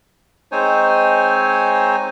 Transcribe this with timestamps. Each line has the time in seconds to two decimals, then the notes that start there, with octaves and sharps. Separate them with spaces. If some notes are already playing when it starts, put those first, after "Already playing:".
0.52 G#3 C4 D#4 C5 C#5 G#5